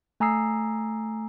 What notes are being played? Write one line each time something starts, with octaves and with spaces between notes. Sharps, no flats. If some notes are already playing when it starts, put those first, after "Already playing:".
A3 G#5 A#5 D#6 E6 C7